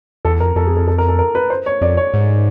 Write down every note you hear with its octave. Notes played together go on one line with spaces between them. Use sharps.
E2 A4
F2 A#4
F2 A4
G#4
A4
A4
A#4
A4
A#4
B4
C5
C#5
F2 D5
C#5
G#2